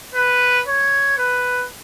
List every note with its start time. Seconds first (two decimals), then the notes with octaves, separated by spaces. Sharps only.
0.14 B4
0.67 C#5
1.18 B4